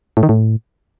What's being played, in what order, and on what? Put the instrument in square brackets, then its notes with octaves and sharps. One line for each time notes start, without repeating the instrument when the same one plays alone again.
[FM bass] A2
D#3
A2